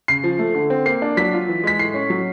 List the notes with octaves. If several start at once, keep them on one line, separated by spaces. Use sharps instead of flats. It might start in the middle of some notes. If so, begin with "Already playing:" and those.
C#3 C7
F3
A3
D3
C4
A#3 C7
D4
F#3 B6
F4
E3
G#3 B6
A2 C7
C#4
F#3